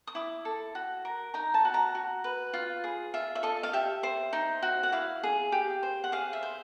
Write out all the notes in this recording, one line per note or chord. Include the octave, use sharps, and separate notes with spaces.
D#6
E4 D6
A4
F#4
A#4
D#4 A#5
A5
F#4
A#5
F#4
B4
F4
G#4
F4 E5
E5
A4 D#5
F5
G4 E5
C5
D#4
F#4
F#5
E4 F5
G#4
G4
C5
F#5
G#4 F5
E5
C5